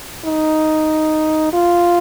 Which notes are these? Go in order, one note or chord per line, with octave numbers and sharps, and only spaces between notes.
D#4
F4